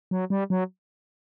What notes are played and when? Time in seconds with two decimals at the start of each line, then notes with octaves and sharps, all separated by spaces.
0.11 F#3
0.30 G3
0.50 F#3